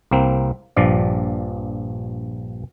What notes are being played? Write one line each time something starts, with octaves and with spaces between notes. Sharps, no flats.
C2 A#3 C4
A#1 G2 F3 D5